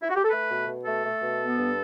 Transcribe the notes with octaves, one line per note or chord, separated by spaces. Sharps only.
E4
F#4
G4
A4
A3 B4
B2
B2
A3 A4
A3
B2
B3
G2